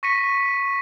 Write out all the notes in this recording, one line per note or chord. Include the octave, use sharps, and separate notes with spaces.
C#6 A#6 B6 C#7 D#7